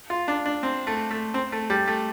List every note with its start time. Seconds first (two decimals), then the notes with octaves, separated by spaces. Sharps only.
0.10 F4
0.28 D4
0.46 D4
0.63 C4
0.87 A3
1.11 A3
1.34 C4
1.52 A3
1.70 G3
1.88 A3